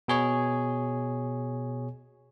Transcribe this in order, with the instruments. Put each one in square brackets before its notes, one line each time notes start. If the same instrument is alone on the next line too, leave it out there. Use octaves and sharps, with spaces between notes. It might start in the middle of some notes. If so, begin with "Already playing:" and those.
[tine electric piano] B2 G#4 C#5